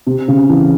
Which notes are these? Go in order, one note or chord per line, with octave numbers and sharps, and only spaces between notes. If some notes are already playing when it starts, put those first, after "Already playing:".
C3
C#3
E3